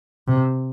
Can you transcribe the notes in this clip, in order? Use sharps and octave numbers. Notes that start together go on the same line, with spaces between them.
C3